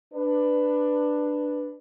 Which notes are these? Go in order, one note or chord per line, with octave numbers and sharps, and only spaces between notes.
D4 B4